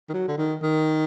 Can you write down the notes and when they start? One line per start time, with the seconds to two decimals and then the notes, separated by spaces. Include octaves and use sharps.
0.10 D#3
0.14 F#3
0.28 D3
0.38 D#3
0.63 D#3